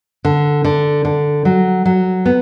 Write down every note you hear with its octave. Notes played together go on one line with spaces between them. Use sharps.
D3
D3
D3
F#3
F#3
B3